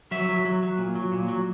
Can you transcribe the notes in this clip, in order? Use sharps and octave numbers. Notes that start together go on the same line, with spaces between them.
F#3 E5
F#3
F#3
F#3
A#2
F#3
A#2
F#3